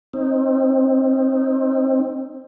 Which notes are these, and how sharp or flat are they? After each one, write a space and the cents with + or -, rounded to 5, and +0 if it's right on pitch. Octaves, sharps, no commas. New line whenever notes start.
C4 +20 D#4 +0